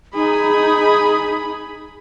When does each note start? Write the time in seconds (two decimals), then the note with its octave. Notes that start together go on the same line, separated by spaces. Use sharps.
0.15 D#4 G#4 B5